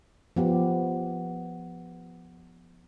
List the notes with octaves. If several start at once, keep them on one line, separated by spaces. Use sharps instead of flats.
F3 B3 G4